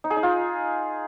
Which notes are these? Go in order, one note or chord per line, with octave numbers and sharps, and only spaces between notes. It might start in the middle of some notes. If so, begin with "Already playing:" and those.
D#4
G#4
D#4
F4